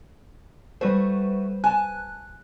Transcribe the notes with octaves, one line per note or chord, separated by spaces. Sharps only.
G3 A3 F#4 B4 C5
G#5 A5 F#6